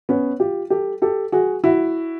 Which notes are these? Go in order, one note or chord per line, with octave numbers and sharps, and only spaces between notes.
B3 C#4
F4 G4
G4 A4
G4 A4
F#4 G#4
E4 F#4